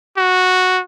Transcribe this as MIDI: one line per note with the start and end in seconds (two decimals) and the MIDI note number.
0.17 0.81 66